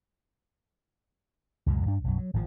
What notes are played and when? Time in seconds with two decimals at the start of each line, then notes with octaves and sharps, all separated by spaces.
1.66 C#2 F#2 B2 G#3
1.86 G2 D4
2.04 B1 F#2
2.18 F#3
2.33 G#1 A2 C3 F3